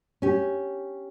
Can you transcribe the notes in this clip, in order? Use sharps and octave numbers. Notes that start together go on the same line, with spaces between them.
C#4 G4